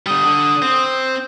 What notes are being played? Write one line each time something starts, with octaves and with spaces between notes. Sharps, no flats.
D3 G3 D#6
D3
C4